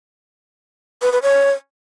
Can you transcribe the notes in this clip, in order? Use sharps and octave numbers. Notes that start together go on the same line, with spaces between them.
B4
B4
C#5